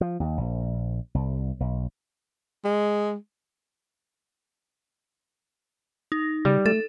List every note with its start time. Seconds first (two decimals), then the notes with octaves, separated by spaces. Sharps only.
0.01 F3
0.20 D#2
0.37 A#1
1.15 C2
1.60 B1
2.65 G#3
6.12 D#4
6.45 C#3 G3
6.66 A3 A4